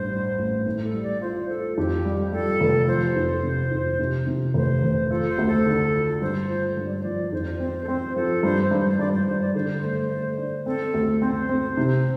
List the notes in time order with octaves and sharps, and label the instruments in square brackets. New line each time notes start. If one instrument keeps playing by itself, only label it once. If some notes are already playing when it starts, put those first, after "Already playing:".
Already playing: [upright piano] A1 G2 [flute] C5
[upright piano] D4
A1
A2
[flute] A4
[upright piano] G3
[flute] D5
[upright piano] F4 [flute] C5
[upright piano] F4 [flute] A4
[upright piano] F2 [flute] G4
[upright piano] G3
[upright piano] G3 [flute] A4
[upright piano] F1
[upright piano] F3 [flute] C5
[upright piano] F2
C3
F2
C3
C3
[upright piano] F1 [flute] C5
[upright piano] F1
[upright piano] F4 [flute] A4
[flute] C5
[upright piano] D2
[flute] A4
[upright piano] D3
F4
[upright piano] G2 [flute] C5
[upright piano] F4
G2
[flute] D5
C5
[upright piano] F3 [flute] D5
[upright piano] F2 [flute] C5
[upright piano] C4 [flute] C5
[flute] A4
[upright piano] C4 [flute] C5
[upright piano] F3 [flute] A4
[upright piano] G2 [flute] C5
[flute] C5
[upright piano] G2
[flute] C5
[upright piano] G2 [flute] D5
[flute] C5
[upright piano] G2 [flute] C5
[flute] D5
[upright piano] D3 [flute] C5
[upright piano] A3
A3
D4
[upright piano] C4 [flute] A4
[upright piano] D2
[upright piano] C4 [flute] C5
[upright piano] C4
C3